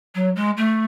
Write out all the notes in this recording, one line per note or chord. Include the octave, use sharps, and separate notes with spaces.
F#3
G#3
A3